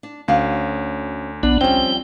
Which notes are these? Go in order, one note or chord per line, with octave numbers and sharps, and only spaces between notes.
D4
D2 C#4 F#4 F5
B1 B3 D4
F3 G3 C4 C#4 G5